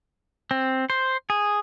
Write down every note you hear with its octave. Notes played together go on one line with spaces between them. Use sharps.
C4
C5
G#4